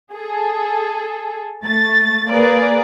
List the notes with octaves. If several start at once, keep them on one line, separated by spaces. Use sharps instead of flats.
G#4 A4
A3 A6
A#3 G#4 A#4 B4 D5